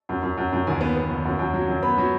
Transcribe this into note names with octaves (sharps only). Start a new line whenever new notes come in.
F#2
F#2
F#2
F#2
D#2 G#5
B3
B3
D#2
F#2
F#2
F#3
F#2
B3 B5
F#3